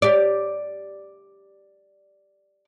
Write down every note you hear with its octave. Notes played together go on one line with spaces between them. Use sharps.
G4 D5